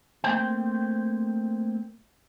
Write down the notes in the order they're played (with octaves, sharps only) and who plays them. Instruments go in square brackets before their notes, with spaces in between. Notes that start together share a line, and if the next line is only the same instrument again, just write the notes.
[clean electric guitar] A3 A#3 C4 C5 G5